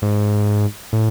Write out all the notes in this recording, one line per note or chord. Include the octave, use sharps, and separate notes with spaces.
G#2
A2